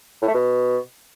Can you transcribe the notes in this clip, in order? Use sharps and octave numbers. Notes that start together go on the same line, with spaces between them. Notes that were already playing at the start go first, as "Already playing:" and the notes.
A2
A3
B2